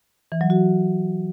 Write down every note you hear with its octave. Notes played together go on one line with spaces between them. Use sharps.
E3
F#3
F#4